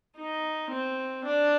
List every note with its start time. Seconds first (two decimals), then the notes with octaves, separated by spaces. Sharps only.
0.16 D#4
0.70 C4
1.24 D4